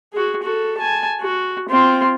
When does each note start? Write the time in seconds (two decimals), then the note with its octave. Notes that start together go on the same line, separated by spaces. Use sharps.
0.13 F#4 G#4
0.42 F#4 A4
0.78 G#5 A5
1.21 F#4
1.69 C4 F4